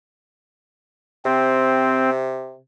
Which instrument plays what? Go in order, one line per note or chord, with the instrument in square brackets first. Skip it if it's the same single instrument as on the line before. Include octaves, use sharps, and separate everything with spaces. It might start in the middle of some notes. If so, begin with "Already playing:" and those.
[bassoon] C3 [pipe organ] C4